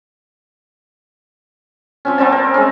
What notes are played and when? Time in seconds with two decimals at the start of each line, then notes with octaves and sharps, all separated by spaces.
2.05 F3 C4 C#4
2.18 B3 C4 D5 A5
2.32 A#4
2.54 G#3 C#4